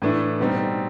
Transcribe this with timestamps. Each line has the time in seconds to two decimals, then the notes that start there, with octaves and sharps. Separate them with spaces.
0.02 A2 E3 A3 D4
0.40 B2 G3 C4 D#4